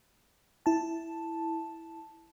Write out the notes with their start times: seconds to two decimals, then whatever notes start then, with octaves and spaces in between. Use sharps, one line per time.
0.66 E4 A5